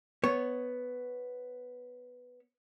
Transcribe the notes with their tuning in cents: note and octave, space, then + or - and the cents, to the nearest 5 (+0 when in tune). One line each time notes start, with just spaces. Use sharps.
B3 +5 C#5 +0